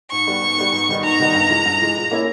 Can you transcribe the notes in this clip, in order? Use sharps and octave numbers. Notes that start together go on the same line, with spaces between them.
G#2 C#6
G3 B3
G#2
G3 B3
G#2
D#3 G3 B3 D#4
G#2 A#5
D#3 G3 B3 D#4
G2
E3 G#3
G2
E3 G#3
A#2
A#3 C#4 E4